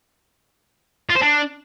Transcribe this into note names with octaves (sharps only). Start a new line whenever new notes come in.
F4
C5
D4